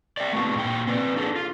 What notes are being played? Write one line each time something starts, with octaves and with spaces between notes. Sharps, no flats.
D5 E5 G5
A3 B3 C4 F#4
A#2 F#4 G5
C4 B4 D5
D4 G#4 A4
F4